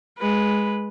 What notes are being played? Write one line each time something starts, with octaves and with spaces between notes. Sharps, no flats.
G#3 B4